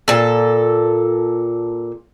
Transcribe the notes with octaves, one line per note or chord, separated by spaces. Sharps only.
A#2 A4